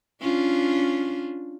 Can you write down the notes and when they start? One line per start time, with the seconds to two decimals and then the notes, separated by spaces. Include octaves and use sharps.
0.22 C#4 D4 F4